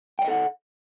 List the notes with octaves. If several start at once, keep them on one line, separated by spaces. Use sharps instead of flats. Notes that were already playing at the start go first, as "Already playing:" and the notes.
A4 D5 D#5 F#5 G5